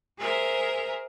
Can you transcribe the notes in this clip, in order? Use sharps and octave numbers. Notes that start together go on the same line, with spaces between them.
G#4 A#4 C5 E5